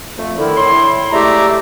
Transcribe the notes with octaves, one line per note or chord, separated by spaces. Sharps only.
F2 A3
D3 D#3 E4
A2 C6
G#3 A3 G4 D5 E5 A#5